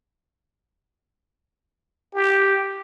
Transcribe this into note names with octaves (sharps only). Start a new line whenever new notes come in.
G4